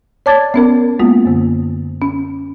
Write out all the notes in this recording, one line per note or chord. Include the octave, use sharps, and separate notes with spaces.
C#5 D5 A5 D6 G#6 A6
B3 C#4 A#4
G#3 A#3 B3 F4
F#2 D3
C#4